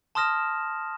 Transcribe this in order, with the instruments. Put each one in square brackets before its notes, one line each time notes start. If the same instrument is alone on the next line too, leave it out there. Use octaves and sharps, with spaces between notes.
[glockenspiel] A5 C6 D#6 F6 A#6 E7